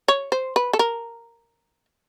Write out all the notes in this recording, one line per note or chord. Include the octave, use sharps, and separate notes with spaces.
C#5
C5
B4
A4
A#4